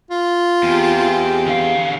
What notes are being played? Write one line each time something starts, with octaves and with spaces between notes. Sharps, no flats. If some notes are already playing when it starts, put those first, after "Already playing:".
F4
E2 C4 G4 G#4
D3 F5